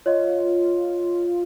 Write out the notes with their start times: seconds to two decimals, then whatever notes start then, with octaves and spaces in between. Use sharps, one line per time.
0.06 F4 C#5 D#5